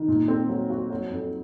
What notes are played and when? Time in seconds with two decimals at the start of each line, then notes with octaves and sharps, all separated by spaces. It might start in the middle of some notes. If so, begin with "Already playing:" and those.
Already playing: D#3
0.08 A#2
0.28 C4
0.49 F#3
0.70 F#4
0.90 F#3
1.11 F2